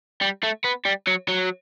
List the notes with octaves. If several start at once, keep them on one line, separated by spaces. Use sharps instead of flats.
G3
A3
B3
G3
F#3
F#3